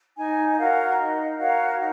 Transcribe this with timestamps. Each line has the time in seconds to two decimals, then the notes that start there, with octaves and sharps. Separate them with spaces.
0.17 D#4 G#5
0.57 F#4 A#4 C#5 F5
0.97 D#4 D#5
1.37 F#4 A#4 C#5 F5
1.77 D#4